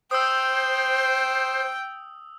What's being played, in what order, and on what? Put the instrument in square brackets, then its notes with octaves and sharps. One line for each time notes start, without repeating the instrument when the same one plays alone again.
[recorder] C5 [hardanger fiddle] G5 [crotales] D#6 E6